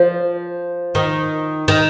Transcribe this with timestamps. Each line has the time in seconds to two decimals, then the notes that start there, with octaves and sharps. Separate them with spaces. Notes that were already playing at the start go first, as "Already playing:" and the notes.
Already playing: F3
0.95 D#3
1.68 D#3